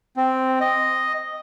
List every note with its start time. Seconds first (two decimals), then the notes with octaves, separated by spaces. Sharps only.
0.17 C4
0.61 D#5